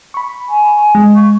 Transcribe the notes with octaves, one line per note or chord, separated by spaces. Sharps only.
B5 C#6
G#5
G#3
C#6